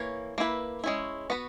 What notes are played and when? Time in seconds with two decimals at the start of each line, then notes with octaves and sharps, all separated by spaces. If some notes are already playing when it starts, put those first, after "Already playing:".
Already playing: E3 A#3 C#5
0.38 A#3 E4 B4
0.84 G#3 C#4 E4
1.30 B3 F#4 B4